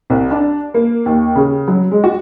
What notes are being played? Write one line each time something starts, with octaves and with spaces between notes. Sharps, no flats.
C2
D4
A#3
D#2
C#3
F#3
G#3
F#4